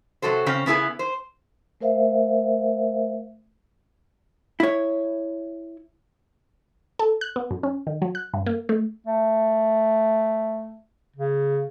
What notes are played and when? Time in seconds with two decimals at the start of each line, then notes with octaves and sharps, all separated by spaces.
0.22 C3 F#3 F#4 A4 C5
0.46 C#3 C4 C#4
0.66 C#3 B3 E4 G#4 B4
0.99 C5
1.81 A3 A#4 C5 E5 F5
4.60 E4 C#5
6.99 A4
7.21 F#6
7.36 B3
7.51 F#2
7.63 C#4
7.87 D#3
8.02 F#3
8.15 F#6
8.34 G2
8.46 A#3
8.69 A3
9.07 A3
11.16 C#3